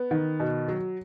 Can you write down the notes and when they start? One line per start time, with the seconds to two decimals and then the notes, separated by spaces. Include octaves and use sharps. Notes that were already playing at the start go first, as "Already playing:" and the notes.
Already playing: B3
0.11 D#3
0.40 B2
0.68 F#3